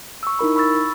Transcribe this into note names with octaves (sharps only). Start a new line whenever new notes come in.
C#6 E6
D#4 E4 A#4 B5
B5 C#6 E6 A6